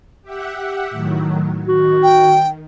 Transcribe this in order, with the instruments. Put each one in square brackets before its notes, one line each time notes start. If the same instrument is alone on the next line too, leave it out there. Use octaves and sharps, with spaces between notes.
[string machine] G4 E5 F#5
A2 D#3 F#3
[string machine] D#3 [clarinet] F#4
[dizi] G5